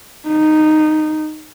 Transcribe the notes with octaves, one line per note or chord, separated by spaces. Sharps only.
D#4